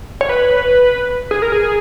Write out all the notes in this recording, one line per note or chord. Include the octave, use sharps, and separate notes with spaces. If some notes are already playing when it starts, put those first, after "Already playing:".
C#5
B4
G#4
A#4
G#4